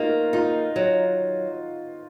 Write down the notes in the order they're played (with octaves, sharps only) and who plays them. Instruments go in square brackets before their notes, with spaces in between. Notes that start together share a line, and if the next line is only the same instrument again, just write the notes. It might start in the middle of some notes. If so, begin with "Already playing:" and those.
Already playing: [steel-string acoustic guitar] A#3 [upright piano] D#4 F4 F#4
[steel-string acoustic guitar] D#4 [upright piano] F4
[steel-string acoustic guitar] F#3